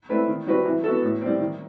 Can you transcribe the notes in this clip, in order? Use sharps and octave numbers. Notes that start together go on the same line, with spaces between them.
A3 C4 E4 B4
D#3
G3 C4 F#4 B4
E3
B3 F#4 A4
A2
G3 C4
D#3